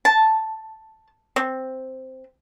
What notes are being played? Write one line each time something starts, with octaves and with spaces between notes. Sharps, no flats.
A5
C4